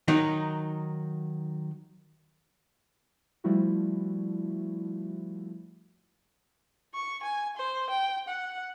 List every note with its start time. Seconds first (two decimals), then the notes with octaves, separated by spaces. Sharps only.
0.08 D#3 F#3 D#4
3.44 F3 G3 A3 E4 F#4
6.94 C#6
7.23 G#5
7.57 C5
7.90 G5
8.28 F#5